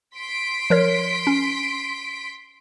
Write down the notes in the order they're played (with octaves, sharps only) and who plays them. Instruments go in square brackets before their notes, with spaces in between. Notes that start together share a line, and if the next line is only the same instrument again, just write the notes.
[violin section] C6 B6 D7
[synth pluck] F3 A#4 C#5
C#4